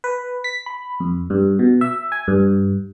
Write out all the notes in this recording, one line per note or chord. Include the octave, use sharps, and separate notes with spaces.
B4
B6
B5
F2
G2
B2
E5
G#5
G2